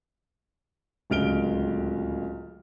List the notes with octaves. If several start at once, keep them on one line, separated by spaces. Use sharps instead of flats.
D1 C#2 F6 D7 G7